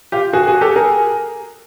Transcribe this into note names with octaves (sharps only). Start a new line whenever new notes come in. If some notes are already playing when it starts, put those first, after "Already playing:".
F4 G4
F#4 G#4
F#4 G#4
G4 A4
G#4 A#4